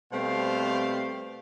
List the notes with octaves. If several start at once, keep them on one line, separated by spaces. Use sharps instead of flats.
B2 G3 A3 C4 C5 F5